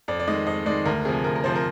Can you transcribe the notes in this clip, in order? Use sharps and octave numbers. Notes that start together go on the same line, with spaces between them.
F2 D5
D5
D#3 G#3 D#5
F2 D#5
D#3 G#3 D5
D2 A#4
C3 F3 G#4
D2 A#4
A#4
C3 F3 C5
A#4